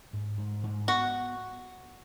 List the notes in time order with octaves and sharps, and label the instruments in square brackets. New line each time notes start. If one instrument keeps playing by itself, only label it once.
[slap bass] G#2
G#2
G#2
[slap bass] B3 [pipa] F#4